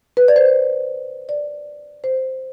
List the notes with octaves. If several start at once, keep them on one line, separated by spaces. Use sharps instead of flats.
B4
D5
C5
D5
C5